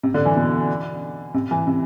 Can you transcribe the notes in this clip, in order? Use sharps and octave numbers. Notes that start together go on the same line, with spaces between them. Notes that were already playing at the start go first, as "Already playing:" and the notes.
C3
D3
E3
B2
C3
E3
C3